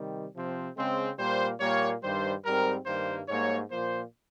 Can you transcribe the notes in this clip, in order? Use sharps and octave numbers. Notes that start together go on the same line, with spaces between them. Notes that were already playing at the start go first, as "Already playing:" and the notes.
Already playing: C3 D#3 G3
C3 F3 C4
C#3 G#3 C4
A#2 G3 A#3 C5
A#2 G3 A#3 C#5
G2 D#3 G3 C5
G#2 G3 C4 A#4
G2 D#3 G3 A#3 C5
G#2 G3 A#3 C#5
A#2 F3 A#3 C5